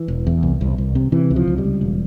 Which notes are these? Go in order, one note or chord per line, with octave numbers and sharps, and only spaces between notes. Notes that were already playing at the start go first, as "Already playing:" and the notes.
Already playing: E3
E1
E2
C2
C2
C2
C3
C3 E3
C#2
F3
C#2
G3
C#2
E1